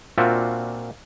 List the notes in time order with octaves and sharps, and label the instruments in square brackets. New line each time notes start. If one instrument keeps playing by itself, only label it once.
[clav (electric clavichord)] A#2 C4 D4 F4 F#4 E5